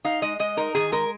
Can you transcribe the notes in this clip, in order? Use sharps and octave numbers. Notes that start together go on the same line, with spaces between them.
D#4 F5
G#3 D#5
G#3 D#5
D#4 A#4
D#3 G#4
G#3 A#4